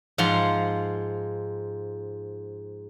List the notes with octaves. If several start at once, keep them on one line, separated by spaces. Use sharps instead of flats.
G#2 F3 F5 F#5 C6